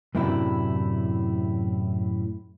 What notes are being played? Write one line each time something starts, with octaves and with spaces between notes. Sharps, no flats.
F#2 A2 C3 D4 E4